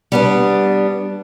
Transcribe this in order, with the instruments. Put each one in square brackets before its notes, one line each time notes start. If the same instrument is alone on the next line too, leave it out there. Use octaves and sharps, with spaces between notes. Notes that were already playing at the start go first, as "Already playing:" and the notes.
[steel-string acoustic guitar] G3 B3 D4